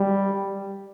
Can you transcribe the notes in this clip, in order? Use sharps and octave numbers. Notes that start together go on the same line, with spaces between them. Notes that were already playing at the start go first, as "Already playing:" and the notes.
Already playing: G3